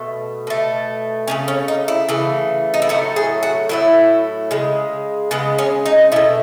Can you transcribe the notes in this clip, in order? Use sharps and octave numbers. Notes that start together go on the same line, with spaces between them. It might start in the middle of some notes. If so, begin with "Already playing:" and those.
Already playing: B2 A3
B2 A3
C#3 E3 A3 C#4
C#4
D#4
E4
C#3 E3 A3
D#4
E4
A2 F#3 A3 F#4
G#4
F#4
A2 F#3 A3 E4
C#3 G#3
C#3 G#3 B3
C#4
D#4
B2 A3 E4